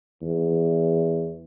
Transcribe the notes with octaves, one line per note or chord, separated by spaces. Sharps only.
E2